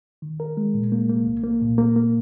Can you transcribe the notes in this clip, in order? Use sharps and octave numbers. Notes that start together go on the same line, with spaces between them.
D#3
A#4
G#3
A#2
A#3
A#3
C2
A#3
A#2
A#3
A#3